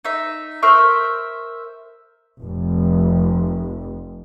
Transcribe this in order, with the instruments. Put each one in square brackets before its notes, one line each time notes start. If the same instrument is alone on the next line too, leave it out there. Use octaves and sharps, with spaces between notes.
[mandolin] D#4 E5
A#4 C5 E5 C#6
[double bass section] F1 F2